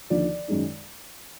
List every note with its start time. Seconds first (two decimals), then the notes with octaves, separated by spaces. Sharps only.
0.10 D#2 D3 F3 D5
0.48 F#2 D#3 G#3 D#4